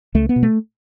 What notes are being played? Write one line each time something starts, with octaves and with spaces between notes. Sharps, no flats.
C#2 A3
B3
B2
A3